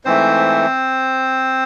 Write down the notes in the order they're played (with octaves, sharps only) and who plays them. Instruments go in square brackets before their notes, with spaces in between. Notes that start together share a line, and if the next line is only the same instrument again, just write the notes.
[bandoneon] G#2 E3 A3 C4 C5